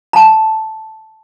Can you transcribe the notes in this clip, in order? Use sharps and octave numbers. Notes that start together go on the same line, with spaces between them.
A5 A#5